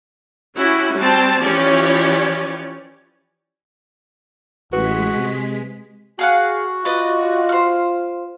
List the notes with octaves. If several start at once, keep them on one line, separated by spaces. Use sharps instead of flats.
C#4 E4 F#4 G4
G3 C4 F#4 A5
E3 F3 C#4 G4 C#5 D5
A1 G#3 F#4 B4 B6
C3
F#4 G#4 F5 F#5
F4 B4 D5 D#5
C5 F6